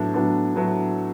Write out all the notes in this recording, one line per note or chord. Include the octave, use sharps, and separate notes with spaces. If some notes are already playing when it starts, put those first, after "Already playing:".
Already playing: A2 F#3 B3 D4
A2 F#3 B3 D4
A2 F#3 B3 D4